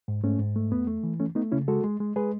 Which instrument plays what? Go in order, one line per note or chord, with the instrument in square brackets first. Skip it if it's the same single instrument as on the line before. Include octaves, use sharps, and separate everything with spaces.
[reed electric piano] G#2
G#2 A3 C#4
G#2
A3
E2 B3
A3
E3
A3 C#4
A3 B3 D#4
C#3 C#4 E4
G#3 F#4 A4
G#3
G#3
G#3 G#4 B4